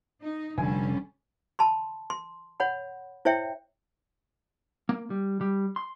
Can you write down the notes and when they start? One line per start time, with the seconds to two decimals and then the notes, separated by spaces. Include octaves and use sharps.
0.22 D#4
0.58 F1 D3 G3 C#4 G#5
1.59 A5 B5 C6
2.10 C6
2.60 C#5 F#5 B5
3.25 E4 C5 C#5 E5 G5
4.89 A#3
5.10 G3
5.41 G3
5.76 C6